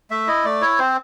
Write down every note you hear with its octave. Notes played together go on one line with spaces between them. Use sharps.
A3 E5
E4 D#5
A3 D5
E4 C#5
C4 C5